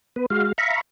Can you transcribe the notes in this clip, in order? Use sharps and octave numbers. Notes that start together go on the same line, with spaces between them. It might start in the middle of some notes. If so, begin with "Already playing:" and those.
B3 B4
G#3 F#4 F5
E5 F5 A#5 B5 C#6